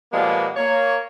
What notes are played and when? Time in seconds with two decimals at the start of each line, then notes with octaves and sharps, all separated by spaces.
0.13 B2 F3 G3 G#3 A#3 B3
0.56 A#3 C#5